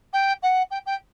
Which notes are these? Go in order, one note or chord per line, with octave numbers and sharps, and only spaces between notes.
G5
F#5
G5
G5